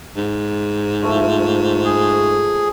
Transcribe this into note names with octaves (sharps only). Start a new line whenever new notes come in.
G#2
F3 A3
G#4